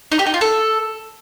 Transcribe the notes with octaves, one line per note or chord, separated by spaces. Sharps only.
D#4
G4
D#4
F4
A4